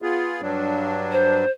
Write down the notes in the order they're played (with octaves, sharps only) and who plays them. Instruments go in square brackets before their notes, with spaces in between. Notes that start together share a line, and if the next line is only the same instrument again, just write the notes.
[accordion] B3 F4 G#4
G2 F#3 D4
[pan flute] C5